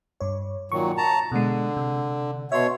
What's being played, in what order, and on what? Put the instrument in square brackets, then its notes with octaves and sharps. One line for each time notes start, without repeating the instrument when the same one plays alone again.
[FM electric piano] G2 C#5
[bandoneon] A#2 D#3 F#3 [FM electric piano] C#6
[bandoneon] A5 A#5
[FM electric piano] B2 G#3 [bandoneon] D3
[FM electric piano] C3
[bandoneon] B2 C#5 [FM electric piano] E5 C6